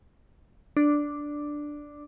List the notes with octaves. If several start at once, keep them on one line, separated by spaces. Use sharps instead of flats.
D4